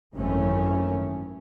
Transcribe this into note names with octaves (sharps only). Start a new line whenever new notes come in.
G#1 F#2 D#3 E3 A3 C#4